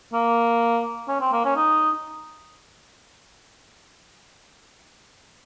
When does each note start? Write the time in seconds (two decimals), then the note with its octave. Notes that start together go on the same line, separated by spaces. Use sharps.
0.13 A#3
1.08 C#4
1.21 C4
1.33 A#3
1.45 C#4
1.56 D#4